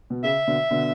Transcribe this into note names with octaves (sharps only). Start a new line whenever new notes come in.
B2
C#3 E5
B2 D3
B2 D3